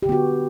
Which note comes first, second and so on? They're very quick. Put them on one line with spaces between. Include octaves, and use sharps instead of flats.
G4 D3 B3 F#4